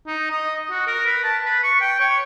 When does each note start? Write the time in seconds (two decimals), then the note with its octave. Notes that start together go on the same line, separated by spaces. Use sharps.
0.07 D#4
0.31 D#5
0.71 F#4
0.87 A#4
1.06 B4
1.24 A5
1.45 B4
1.63 C#6
1.81 G5
2.00 C#5